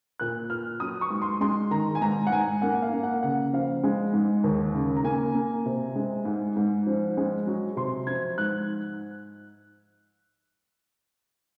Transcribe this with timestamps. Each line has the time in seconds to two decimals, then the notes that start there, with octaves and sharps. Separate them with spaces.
0.20 A#2 F#6
0.50 A#2 F6
0.80 F#3 D#6
1.01 C#6
1.10 G#2
1.22 C6
1.41 G#3 C6
1.71 D#3 A#5
1.95 G#5
2.02 G#2 A#5
2.27 F#5
2.31 G#2 G#5
2.62 A#3 F#5
2.82 F5
2.93 A#3
3.03 F#5
3.23 C#3 F#5
3.53 F3 F5
3.83 G#3
4.14 G#2
4.44 D#2
4.74 C#3
4.96 A#5
5.04 A#3 G#5
5.35 A#3
5.66 C3
5.96 G#3
6.25 G#2
6.57 G#2
6.87 F3
7.17 G#3
7.47 F#3
7.77 C3 C6
8.07 F3 G#6
8.38 G#2 F#6